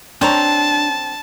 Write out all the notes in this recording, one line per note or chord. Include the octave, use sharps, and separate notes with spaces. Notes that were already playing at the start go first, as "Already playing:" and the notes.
C4 D4 C#5 A5 A#5